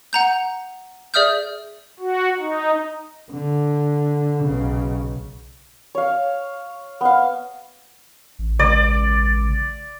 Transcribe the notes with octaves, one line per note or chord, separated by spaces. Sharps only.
F#5 A#5 G6
G#4 D5 E5 D#6 F6 G6
F#4
D#4
D3
B1 C#3
C#5 F5
B3 F5
A1
C#2 D5